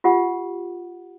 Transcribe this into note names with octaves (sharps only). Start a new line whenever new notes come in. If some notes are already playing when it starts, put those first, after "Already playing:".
F4 G4 F#5